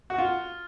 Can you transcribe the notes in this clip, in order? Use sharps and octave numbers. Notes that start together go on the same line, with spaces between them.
F#4
F4